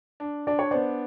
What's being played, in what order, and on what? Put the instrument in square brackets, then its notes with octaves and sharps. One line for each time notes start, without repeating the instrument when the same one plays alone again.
[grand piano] D4
[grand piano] D4 [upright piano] D5
[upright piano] C#5
[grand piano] B3 [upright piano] C5 D5